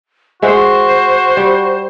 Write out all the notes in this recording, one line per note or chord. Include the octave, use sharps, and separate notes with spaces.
G#3 F#4 C5 E5 F#5
G3